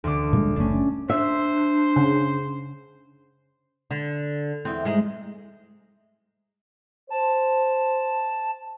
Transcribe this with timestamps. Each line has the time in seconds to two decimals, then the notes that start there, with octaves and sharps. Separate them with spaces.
0.04 D2 D3 D6
0.33 A#2 G3 G#3
0.56 F#1 A3 C#4 D4
1.10 D4 C5 E5
1.96 C#3
3.91 D3
4.65 E2 C4
4.85 G#2 G#3
7.10 C5 A5